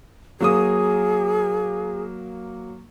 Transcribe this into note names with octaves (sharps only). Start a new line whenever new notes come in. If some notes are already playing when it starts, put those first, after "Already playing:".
F#3 A#3 G#4 D#6